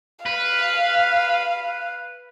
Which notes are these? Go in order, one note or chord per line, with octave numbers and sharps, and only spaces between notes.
B4 F5